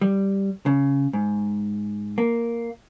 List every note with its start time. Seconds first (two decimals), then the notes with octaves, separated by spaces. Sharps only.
0.01 G3
0.66 C#3
1.13 G#2
2.18 A#3